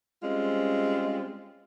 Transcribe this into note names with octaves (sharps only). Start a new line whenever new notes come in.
G3 G#3 C4 C#4 F4